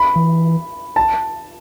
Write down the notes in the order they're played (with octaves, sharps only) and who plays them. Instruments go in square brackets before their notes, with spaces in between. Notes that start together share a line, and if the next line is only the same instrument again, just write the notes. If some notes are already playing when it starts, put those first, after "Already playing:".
Already playing: [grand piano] B5
[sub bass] E3
[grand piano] A5